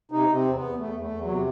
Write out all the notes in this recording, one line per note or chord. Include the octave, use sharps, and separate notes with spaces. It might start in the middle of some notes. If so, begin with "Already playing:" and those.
C3 D#4
C3
C4
E2
B3
E2
E2 A3
E2
A3
E2
F#3
C3